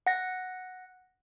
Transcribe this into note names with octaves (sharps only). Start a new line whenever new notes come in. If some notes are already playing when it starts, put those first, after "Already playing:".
F#5 A#6